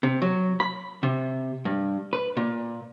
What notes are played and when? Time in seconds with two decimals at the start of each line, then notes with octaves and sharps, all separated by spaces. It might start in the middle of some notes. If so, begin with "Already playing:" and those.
0.03 C3
0.22 F#3
0.60 B5
1.03 C3
1.65 G2
2.13 B4
2.37 A#2